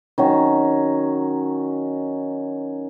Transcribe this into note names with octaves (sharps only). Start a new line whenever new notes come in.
D#3 F#3 C#4